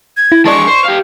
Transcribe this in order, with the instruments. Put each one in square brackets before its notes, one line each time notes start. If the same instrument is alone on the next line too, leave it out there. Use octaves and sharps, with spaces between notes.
[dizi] G#6
[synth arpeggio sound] E4
[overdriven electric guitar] G#3 D4 [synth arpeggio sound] D5 D#5 A5 [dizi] C#6
[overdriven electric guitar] C5
G4 F5